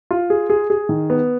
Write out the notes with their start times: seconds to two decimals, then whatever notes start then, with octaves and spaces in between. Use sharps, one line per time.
0.11 F4
0.30 G#4
0.50 G#4
0.70 G#4
0.89 D#3
1.10 B3